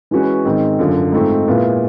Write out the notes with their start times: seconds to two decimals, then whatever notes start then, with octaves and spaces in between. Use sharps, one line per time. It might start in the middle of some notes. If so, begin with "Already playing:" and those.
0.11 E3 G#3 C#4 F#4 B4
0.45 G#2 D#3 G#3 C4
0.79 F#2 D3 F3
1.12 G#2 F3 A3 C4 D#4
1.47 A#2 F3 G#3 B3 E4